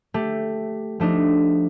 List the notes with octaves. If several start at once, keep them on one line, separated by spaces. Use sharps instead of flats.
A3 G4
F3 A3 D4 D#4